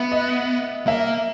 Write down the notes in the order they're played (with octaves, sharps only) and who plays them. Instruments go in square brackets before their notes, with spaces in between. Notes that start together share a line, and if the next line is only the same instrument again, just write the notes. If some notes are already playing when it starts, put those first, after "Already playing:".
Already playing: [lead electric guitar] B3 [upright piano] E5
[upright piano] D#5
[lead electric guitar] A#3 [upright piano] E5